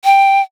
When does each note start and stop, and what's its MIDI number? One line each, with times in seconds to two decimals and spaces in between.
0.04 0.41 79